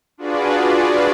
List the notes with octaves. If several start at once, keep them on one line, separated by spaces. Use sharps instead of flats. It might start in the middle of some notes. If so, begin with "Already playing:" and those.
D4 F4 F#4 G#4 B4 D5